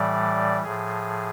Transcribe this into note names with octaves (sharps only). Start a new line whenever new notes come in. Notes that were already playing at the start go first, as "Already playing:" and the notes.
Already playing: A2 E3 G3 D5
A2 F3 G#4